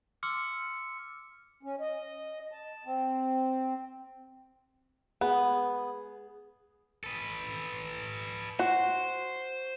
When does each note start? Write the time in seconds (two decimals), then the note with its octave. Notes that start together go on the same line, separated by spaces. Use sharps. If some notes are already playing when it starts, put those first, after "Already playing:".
0.23 C6 D6 E6 F6 C#7
1.63 C#4
1.80 D#5
2.52 A5
2.85 C4
5.21 B3 G#4
7.04 A4 B4
8.59 F#4 C5